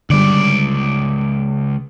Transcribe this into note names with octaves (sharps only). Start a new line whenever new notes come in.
C#2 D3 G3 D5